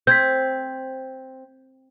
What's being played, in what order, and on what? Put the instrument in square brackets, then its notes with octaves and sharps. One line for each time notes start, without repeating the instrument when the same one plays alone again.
[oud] C4 [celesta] G6 G#6 B6